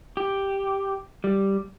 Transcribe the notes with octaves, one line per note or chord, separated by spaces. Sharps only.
G4
G3